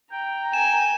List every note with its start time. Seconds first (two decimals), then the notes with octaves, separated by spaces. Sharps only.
0.11 G5 A#5
0.53 G#5 E7